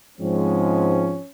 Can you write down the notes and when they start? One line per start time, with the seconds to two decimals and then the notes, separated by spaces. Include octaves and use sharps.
0.18 G#2 F3 G#3 C4 C#4